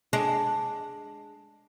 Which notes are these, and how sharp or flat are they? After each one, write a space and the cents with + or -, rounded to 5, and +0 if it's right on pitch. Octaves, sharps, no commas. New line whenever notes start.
G#3 +0 D4 +0